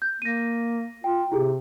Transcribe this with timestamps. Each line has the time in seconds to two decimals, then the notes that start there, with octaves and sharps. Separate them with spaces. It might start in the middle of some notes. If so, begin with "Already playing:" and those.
0.02 G6
0.22 A#3 A#6 D#7
1.04 F4 G5
1.32 C3 E4 G4 G#4